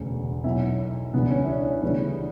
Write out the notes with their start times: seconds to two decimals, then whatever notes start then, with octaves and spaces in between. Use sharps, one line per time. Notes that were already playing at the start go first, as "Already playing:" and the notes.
Already playing: E1 D2 C#3
0.44 B1 B2 F#3 E4
1.14 C#2 C#3 E3 G3 B3
1.30 C#4
1.44 E4
1.48 D4
1.65 C#4
1.82 D2 C#3 E3 G3 B3